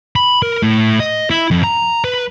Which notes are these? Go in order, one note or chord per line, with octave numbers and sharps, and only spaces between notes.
B5
A#4
A2
D#5
E4
F2
A#5
B4